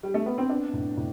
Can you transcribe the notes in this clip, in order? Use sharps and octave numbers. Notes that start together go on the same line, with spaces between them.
G3
A3
B3
C4
B3 D4
A2
A2